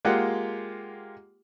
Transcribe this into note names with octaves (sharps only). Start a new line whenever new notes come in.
G#3 A#3 F4 G4 F#5